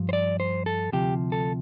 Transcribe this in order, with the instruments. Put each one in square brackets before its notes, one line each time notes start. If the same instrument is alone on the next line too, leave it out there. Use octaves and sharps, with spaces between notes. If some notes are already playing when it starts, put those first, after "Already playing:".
Already playing: [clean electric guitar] G2 F3
C5
D5
C5
A4
D2 C3 F3 G4
A4